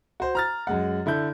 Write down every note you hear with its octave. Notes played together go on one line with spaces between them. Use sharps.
F#4 C5
A#5 F6 A6
F#2 G#3 F#5
D3 E4 A4 G6